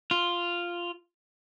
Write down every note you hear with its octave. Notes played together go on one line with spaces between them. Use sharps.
F4